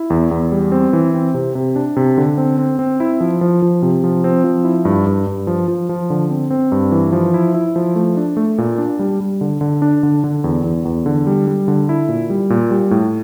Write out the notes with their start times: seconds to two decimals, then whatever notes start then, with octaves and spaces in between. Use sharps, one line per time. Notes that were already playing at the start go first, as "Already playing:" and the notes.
Already playing: E4
0.10 E2
0.31 E2
0.52 G3
0.72 C4
0.93 E3
1.14 C4
1.34 C3
1.55 C3
1.76 D4
1.96 C3
2.18 D3
2.38 C4
2.58 C4
2.79 C4
3.00 E4
3.21 F3
3.41 F3
3.62 F3
3.82 C3
4.04 F3
4.24 C4
4.44 F3
4.64 E4
4.85 G2
5.06 G2
5.27 G2
5.47 F3
5.68 F3
5.89 F3
6.10 D3
6.30 C4
6.50 C4
6.72 G2
6.92 E3
7.12 F3
7.34 E4
7.54 E4
7.76 F3
7.96 A3
8.17 D4
8.37 A3
8.58 A#2
8.78 D4
8.99 G3
9.20 G3
9.41 D3
9.61 D3
9.82 D4
10.03 D3
10.24 D3
10.44 E2
10.64 E2
10.85 E2
11.06 D3
11.27 G3
11.47 G3
11.68 D3
11.89 E4
12.08 A#2
12.30 G3
12.50 A#2
12.71 G3
12.91 A2